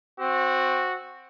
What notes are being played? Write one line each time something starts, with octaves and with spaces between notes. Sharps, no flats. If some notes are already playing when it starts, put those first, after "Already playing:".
C4 F#4